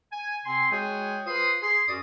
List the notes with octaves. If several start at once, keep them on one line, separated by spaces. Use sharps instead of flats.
G#5
C3 C4 G#5 C6
G#3 F#4 G#4 C#5 G5 G#5
F4 B4 C5 C6 D#6
G#4 C6
F#2 C#4 F#4 D5 D#6